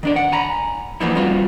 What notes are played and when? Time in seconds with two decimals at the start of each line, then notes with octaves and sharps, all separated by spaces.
0.03 D#3 D4 D5
0.16 F#5
0.32 G#5 A#5 B5
1.00 E3 F3 A#3 B3 D#4 E4
1.15 G3 A3 C4 F4 F#4